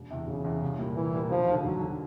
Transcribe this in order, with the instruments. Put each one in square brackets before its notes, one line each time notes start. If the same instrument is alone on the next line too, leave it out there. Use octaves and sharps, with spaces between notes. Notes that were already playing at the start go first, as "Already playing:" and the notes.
Already playing: [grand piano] E1
E2 C3
[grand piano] E1 [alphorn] C#3
[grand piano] E2 C3
C2
A#2 G3 A#3
[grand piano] C2 [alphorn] E3
[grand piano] A#2 G3 A#3
[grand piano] E1 [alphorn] F3
[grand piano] D#2 D3
[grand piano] E1 [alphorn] F#3
[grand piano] D3